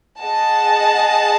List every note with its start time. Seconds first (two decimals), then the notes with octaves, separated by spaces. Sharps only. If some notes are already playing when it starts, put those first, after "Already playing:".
0.19 G#4 D#5 F#5 A5